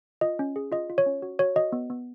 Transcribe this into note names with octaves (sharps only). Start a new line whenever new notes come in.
F4 D#5
C#4
G#4
F4 D#5
F4
C#5
C#4
F#4
F#4 C#5
F#4 D#5
B3
B3